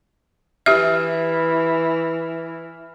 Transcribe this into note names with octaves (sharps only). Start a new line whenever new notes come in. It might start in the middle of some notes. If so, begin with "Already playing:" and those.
E3 G4 E5 F6